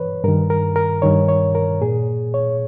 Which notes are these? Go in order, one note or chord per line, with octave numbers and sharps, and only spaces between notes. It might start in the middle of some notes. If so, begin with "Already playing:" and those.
Already playing: G2 E3 B4 C#5
G2 D#3 A#4
A#4
A#4
G2 D#3 C#5
C#5
A#4
A#2 G#4
C#5